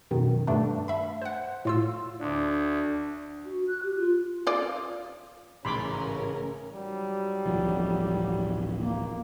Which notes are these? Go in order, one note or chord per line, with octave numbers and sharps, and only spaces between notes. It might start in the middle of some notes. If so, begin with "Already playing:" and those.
F#2 B2 D#3
G2 A3 D4
E5 B5
C5 F#5
A2 F4 E6
D2 D4
F#4
F#6
G4
F4
F4 D5
A1 G#2 C#3 C#4 A#4 B5 C6 D6
G#2 F#3 G3
D1 A1 F3
A#3